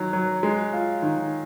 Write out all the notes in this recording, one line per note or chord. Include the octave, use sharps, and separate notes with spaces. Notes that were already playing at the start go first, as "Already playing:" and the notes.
Already playing: D#3 F#3
F#3
G#3
F4
D#3